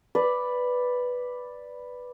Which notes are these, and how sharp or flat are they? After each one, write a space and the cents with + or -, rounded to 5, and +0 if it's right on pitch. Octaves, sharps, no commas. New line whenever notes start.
B4 +0 D5 +0